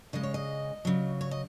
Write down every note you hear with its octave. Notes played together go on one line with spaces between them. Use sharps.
C#3 G#3 D#5
C#5
D#5
C#3 F#3
C#5
D#5